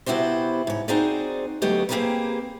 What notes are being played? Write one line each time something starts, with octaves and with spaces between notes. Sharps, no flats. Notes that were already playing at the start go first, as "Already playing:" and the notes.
C3 B3 E4 F#4 G4 C5
G#2 C#5
C4 D#4 F#4 G#4 C5 D5
D2 F#3 A3 B3 G4 D#5
A#3 C4 G4 G#4 A#4 B4